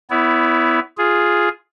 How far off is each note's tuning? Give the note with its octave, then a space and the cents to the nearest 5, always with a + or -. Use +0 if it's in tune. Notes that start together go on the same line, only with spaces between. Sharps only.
B3 +15 E4 +0 C#5 +40
F4 +0 G#4 +0